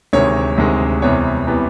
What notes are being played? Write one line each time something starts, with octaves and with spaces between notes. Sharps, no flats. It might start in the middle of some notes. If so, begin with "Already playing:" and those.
D2 C3 D#3 G#3 C#5
D2 C3 D#3 G#3
E2 C3 E3 G3 B3 C#5
C3 E3 G3 B3